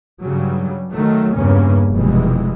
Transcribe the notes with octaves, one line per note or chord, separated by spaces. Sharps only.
G2 C#3 F#3 G3
D#3 F#3 A3
E2 G2 C#3 A#3 C#4
F1 B2 E3 G3 G#3